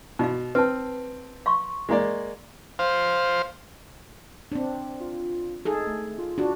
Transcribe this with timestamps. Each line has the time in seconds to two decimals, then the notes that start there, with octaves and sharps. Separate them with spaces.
0.19 B2 D#4 F5
0.55 C4 B4 A5
1.46 F5 C6 C#6
1.89 G#3 A#3 D5
2.79 C5 F5
4.52 C4 D4
5.00 F4
5.65 D#4 G#4 A4
5.86 A3
6.18 F4
6.38 D4 F#4